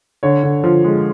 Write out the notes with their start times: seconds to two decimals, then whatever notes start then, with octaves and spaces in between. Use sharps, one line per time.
0.23 D3 C#5
0.43 D3
0.64 F3
0.84 G#3